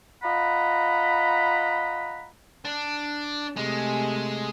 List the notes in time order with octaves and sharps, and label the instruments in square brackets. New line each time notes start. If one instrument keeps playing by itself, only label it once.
[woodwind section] F4 D#5 F#5 A#5 B5
[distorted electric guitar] D4
[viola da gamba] C3 A3 [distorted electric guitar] G#3